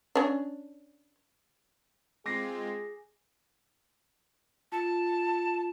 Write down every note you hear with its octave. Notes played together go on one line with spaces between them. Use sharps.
C#4 D4
G#3 C4 F4 G#4 D6 A#6 C7
F4 A5